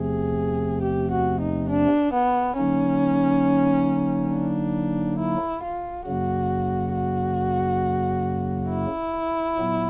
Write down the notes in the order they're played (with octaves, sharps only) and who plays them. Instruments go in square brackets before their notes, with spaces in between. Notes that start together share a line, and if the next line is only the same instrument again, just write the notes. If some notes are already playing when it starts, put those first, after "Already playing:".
Already playing: [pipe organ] E2 C3 F3 A3 C4 [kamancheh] G#4
[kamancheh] G4
F#4
D#4
D4
B3
[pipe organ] D3 F#3 A#3 D#4 [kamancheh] C#4
[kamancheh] D4
E4
F4
[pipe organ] F#2 C#3 F#3 A#3 [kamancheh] F#4
[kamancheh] F#4
E4
[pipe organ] A#2 F#3 B3